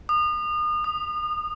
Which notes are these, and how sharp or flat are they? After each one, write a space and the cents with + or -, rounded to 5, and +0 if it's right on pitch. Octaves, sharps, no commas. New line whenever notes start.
D#6 -35
D#6 -15